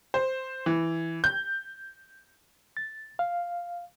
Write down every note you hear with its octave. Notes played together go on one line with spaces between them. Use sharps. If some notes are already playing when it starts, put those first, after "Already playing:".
C5
E3
G6
A6
F5